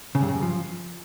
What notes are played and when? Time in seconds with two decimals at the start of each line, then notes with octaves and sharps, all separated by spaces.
0.15 C#3
0.22 G2
0.29 C#3
0.35 F#2
0.42 F3